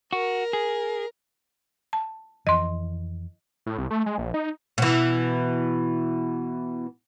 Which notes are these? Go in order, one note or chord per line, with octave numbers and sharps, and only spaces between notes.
F#4 A#4
G#4
A5
F2 E3 D#5 C6
A2
C2
A3
G#3
A#1
D#4
B2 E3